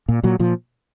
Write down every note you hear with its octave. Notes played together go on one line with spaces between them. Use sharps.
A#2
A#2 F#3
A#2 F3